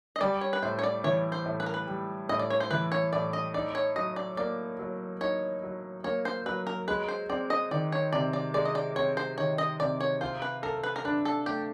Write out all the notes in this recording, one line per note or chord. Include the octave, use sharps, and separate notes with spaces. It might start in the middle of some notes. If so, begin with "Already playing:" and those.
D#5
G3 D5
C#5
B4
A2 C5
C#5
D5
E3 C#5
C5
A2
B4
A#4
B4
G3
A2 D#5
D5
C#5
C5
E3 B4
C#5
A2 D5
D#5
D#4 D5
C#5
F#3 D#5
D5
A#3 D5
F#3
D#4 C#5
F#3
A#3 C#5
C5
F#3 B4
A#4
G#3 B4
C5
C4 D5
D#5
D#3 D5
C#5
C3 D5
D5
G#3 D5
D#5
D5
C4 C#5
C5
D#3 C#5
D#5
C3 D5
C#5
F4 C5
B4
A4 A#4
B4
A#4
D4 B4
A4
A3 G4